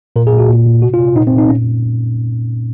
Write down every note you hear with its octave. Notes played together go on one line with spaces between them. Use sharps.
A#2 A#4
G#4
A#2
F#4
A#2
A#2
C3 F#4
F4
C3
F4
A#2 D#4
C4
A#2
D#4
A#2 C#4